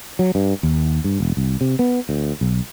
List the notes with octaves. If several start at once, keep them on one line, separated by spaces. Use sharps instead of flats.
F#3
G2
D#2
G2
E1
C2
C3
B3
D2
B1